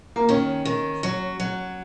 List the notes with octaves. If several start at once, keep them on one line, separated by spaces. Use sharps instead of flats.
A#3
D#3 C#4
D#3
F#3
F#3